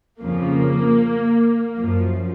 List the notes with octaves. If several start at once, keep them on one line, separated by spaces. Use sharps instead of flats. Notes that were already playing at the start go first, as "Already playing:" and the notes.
F2 C#3 F3 A#3
F#2 F3